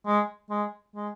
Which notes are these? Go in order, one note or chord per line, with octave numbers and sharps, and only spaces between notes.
G#3
G#3
G#3